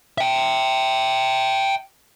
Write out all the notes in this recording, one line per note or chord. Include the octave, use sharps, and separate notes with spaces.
E5 G5